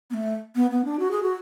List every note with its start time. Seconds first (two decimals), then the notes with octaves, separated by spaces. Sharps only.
0.10 B3
0.14 A3
0.56 B3
0.71 B3
0.85 D4
0.99 F#4
1.11 G#4
1.23 F#4